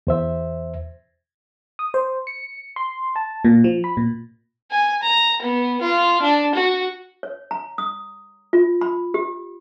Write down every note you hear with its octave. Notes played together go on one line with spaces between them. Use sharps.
E2 C5 E5
D#6
C5
C#7
C6
A5
A#2
F3
B5
A#2
G#5
A#5
B3
F4
D4
F#4
C#5
A#5
D#6
F4
B5
G4